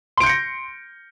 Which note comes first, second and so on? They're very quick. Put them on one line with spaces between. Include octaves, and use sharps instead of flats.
C6 D7 G6 C#7 A#6